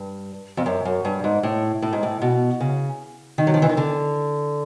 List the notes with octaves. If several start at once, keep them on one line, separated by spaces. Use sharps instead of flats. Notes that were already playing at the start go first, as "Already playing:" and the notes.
Already playing: G2
F2
F#2
F#2
G2
G#2
A2
A2
G#2
A2
B2
C#3
D#3
F#3
F3
E3
D#3
D3